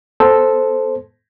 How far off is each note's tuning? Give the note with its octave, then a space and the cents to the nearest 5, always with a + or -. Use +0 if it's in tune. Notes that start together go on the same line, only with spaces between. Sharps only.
B3 +10 A4 -5 C5 +0